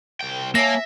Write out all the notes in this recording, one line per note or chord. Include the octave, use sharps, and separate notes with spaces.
C2 G5
A#3 C#5 E5 G#5 A5 A#6